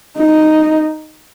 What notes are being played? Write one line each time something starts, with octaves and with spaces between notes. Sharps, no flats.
D#4